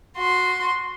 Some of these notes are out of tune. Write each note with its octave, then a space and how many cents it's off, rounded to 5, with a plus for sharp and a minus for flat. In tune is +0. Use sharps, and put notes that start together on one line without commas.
F#4 -15 C6 +0